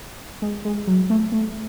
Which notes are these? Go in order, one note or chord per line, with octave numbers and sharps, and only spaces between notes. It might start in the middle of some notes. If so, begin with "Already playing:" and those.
G#3
G#3
F#3
A3
A3